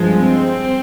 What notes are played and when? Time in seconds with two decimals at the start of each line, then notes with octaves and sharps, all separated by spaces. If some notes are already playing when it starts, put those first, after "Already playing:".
Already playing: G2 F3 G#3
0.14 C4